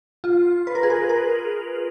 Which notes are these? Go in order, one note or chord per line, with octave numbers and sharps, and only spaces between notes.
F4
B4
A#4
G#4
A#4
A#4